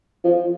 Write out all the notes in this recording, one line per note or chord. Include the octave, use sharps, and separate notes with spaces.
F3